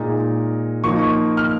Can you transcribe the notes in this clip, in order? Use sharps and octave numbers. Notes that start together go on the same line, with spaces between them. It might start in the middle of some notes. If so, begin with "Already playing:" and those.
Already playing: A#2 G#3 D#4
F3 A#3 D#4 C#6
F6